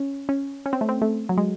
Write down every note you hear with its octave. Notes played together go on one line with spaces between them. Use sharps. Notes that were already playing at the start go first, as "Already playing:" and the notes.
Already playing: C#4
C#4
C#4
C4
A3
C4
A3
F#3
G#3